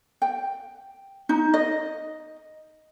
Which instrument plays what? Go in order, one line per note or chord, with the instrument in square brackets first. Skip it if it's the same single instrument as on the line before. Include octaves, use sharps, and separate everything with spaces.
[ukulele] G5
D#4
D#5